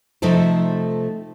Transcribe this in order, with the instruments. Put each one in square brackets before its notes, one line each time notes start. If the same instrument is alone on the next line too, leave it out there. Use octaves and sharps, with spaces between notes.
[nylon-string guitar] C3 F3 A3 D#4 A4 C5